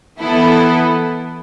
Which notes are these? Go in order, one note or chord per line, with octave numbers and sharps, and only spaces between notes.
E3 B3 E4 A4